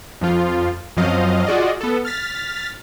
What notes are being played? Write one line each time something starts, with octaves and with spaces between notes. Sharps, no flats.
F2 F3 F4
F#2 F3 F#3 C4 D#5 F5
F4 F#4 G#4 D5 D#5
B3 A4
F6 A6 B6